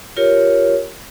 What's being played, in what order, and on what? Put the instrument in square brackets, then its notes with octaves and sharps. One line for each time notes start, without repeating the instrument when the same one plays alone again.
[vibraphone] F4 G4 A#4 C#5